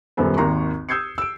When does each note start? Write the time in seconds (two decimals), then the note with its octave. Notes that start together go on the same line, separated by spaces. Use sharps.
0.17 D#1 F#2 G3 B3 A4 C5
0.37 G#1 D#2 A#5 C6 C#6
0.89 D#6 E6 G6 G#6 C7 C#7
1.18 E6 D7